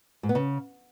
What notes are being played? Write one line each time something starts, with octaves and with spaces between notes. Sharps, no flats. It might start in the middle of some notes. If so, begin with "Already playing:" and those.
G#2
B3
C#3